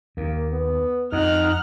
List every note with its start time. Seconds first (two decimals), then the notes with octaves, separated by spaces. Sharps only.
0.17 D#2 A#3
0.52 B3
1.12 F2 D#4 F#5 F6